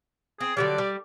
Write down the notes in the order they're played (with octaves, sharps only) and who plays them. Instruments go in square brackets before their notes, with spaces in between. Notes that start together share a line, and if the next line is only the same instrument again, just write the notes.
[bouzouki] C4 [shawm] G#4
[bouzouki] D3 F#3 G3 [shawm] D5
[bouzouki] G3